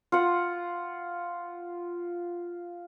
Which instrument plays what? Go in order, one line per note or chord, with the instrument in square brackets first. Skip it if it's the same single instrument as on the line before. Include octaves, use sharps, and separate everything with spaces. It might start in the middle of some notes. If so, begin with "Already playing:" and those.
[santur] F4 F#5